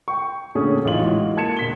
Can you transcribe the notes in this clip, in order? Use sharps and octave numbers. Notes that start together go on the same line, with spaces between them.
G5 C#6
A#2 D3 A3 C#4 G#4
A1 E3 D#4 F4 F#7
E3 G#3 F#4
A#3 A5 G#6 C#7 E7
E1 B6 G7